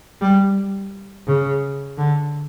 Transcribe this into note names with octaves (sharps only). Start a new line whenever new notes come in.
G3
C#3
D3